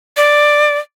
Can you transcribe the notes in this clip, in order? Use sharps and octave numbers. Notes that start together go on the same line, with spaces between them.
D5